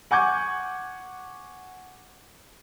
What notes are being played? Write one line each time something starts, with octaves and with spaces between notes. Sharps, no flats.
F#5 G#5 C#6 D6 G6 G#6